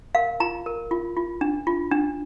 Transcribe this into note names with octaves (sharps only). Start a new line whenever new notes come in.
A#4 F5
F4 A#5
A#4
F4
F4
D4
F4
D4